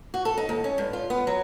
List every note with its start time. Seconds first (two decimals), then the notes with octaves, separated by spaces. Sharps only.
0.14 F#4
0.25 A4
0.38 D#4
0.49 D#2
0.64 C#4
0.78 G2
0.93 F4
1.10 B3
1.27 F#3